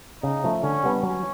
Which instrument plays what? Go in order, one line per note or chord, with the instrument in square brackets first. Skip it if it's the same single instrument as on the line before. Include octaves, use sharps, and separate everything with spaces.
[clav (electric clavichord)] C#3 [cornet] D#4
[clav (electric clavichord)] F3 A3
[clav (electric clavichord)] D3 [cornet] C#4
[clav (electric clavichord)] G3 B3 D4
[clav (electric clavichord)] F#3 [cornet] C#4